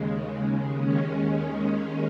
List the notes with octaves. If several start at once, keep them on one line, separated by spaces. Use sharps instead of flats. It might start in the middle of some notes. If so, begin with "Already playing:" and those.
Already playing: D#2 C#3 G#3
D#2 D#3 G#3 C#4